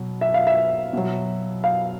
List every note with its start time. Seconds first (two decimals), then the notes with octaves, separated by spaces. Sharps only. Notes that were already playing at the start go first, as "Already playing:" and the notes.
Already playing: B2 F#3
0.21 E5
0.34 F5
0.47 E5
0.93 B2 F#3
1.64 F5